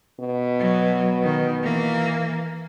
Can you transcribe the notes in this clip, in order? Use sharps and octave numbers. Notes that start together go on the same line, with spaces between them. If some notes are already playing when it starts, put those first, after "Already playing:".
B2
F#3
D#3
E3 A#3